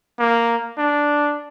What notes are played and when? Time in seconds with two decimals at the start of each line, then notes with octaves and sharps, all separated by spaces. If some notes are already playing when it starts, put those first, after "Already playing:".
0.19 A#3
0.78 D4